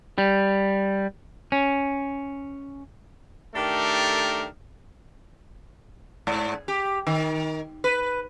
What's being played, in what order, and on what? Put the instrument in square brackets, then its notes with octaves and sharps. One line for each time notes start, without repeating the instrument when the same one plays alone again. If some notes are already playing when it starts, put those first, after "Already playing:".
[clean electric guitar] G3
C#4
[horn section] D#3 A3 D4 G4 A4 A#4
[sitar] G#2
G4
D#3
B4